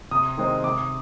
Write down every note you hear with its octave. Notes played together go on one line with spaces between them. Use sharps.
C3 D#6
D#3 G#3 C4 D#4
C3 D6